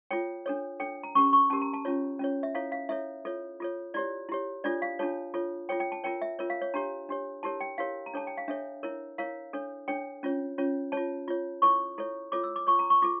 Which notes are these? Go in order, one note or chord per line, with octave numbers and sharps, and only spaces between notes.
F4 A4 C#5 G5
D4 A4 C#5
D4 A4 C#5 G5
A#5
C#4 G4 A#4 C#6
C#6
C#4 G4 A#4 A5
A#5
A5
C#4 F4 C#5
C#4 F4 C#5
E5
E4 A4 C#5 F5
F5
E4 A4 C#5 E5
F4 A4 C#5
F4 A4 C#5
E4 G4 C#5 D5
E4 G4 C#5
D4 F4 A4 C#5 D5
F5
D4 F4 A4 C#5 A5
F4 A4 C#5
F4 A4 C#5 G5
G5
A5
F4 A#4 C#5 G5
E5
F4 A#4 C#5
F5
C#5
D4 G4 C#5 A#5
D4 G4 C#5
E4 G4 A#4 C#5 A5
G5
E4 G4 A#4 C#5 F5
A#5
D4 A4 C#5 A5
G5
F5
D4 A4 C#5 E5
E4 A#4 C#5
E4 A#4 C#5 F5
D4 A4 C#5
D4 A4 C#5 G5
C#4 F4 C#5
C#4 F4 C#5
F4 C#5 A5
F4 C#5
E4 A4 C#5 C#6
E4 A4 C#5
F4 A4 C#5 D6
E6
D6
F4 A4 C#5 C#6
A#5
C#6
F4 A4 D6